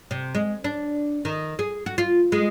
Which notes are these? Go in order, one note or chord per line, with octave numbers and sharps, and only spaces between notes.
C3
G#3
D4
D#3
G#4
F#4
F4
G#3